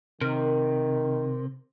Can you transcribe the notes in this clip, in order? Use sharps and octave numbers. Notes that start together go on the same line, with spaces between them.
C3 D#3 A#4